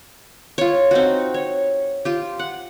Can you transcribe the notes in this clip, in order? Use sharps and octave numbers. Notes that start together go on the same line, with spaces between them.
F4 C#5
C4 D#4 F#4
C#5
F4 G4
F#5